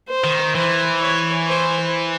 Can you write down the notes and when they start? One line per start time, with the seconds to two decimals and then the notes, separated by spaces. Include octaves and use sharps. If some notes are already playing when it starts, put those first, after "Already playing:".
0.09 C5
0.24 D#3
0.55 E3 C5
1.00 C#5
1.48 C5